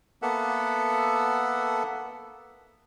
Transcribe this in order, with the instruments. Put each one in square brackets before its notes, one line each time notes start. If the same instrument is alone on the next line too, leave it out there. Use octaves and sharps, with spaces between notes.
[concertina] A#3 B3 A4 E5 F#5